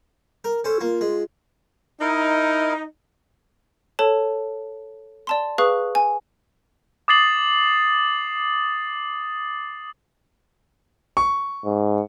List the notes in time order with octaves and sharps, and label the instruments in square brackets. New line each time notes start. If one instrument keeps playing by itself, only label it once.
[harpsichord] A#4
[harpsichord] C#4 C5 [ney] A4
[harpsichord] A#3 [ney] F4
[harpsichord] G#3
[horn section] D#4 [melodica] E4 A#4
[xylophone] A4 C#5 A5
D5 A5 C6
G#4 B4 F5 C#6 D#6 F#6
G#5
[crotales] D6 D#6 A6 C7 F#7
[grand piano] C#6
[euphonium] G#2